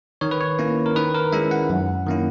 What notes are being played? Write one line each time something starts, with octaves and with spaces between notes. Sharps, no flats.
D#3 C#5
B4
C#5
A#3 C#4 E4
A#4
D#3 B4
A#4
G#3 C#4 E4 E5
F#5
F#2
D#3 A#3 C#4 E4